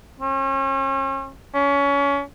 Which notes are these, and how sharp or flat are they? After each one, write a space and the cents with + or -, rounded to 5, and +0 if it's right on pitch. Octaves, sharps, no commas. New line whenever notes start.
C#4 -40
C#4 +25